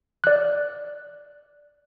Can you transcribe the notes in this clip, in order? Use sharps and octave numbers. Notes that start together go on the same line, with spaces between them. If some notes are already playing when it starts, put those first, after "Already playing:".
D5 F#6